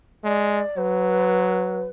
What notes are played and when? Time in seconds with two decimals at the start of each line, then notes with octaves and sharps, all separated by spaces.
0.24 G#3 D5
0.77 F#3 B4